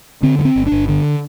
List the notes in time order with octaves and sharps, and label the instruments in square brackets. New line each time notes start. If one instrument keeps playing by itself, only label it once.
[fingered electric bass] D3 C4
G2
C4
G1
D4
G1
D3